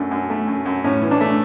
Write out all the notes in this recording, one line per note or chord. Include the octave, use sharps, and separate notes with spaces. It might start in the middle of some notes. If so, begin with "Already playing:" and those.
Already playing: F#2 A3 D4
F#2
A3
F#2
F#2
A2 C#4
E3
D4
A3